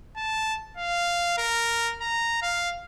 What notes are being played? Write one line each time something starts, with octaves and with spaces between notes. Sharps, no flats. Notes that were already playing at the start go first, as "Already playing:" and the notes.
A5
F5
A#4
A#5
F5